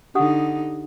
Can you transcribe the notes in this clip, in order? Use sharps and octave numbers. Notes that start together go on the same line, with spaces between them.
D3 D#4 G4 F#5 D#6